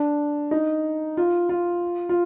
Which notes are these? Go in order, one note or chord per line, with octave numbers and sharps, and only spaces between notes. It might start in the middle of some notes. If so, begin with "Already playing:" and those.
Already playing: D4
D#4
F4
F4
F4